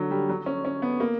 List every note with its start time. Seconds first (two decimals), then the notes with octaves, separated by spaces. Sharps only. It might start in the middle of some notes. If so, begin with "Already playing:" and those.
Already playing: D3 F#3
0.11 G3
0.29 F#3
0.46 C#4
0.65 C#4
0.82 B3
1.00 A#3